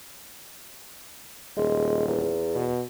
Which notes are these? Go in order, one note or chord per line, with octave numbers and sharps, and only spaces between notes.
D#1 G#3
E2
B2